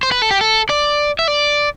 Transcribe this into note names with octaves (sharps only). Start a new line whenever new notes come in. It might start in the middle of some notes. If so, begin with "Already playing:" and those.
C5
B4
A4
G4
A4
D5
E5
D5